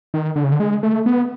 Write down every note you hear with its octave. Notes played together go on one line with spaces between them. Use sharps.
D#3
D3
C#3
D3
G#3
A3
B3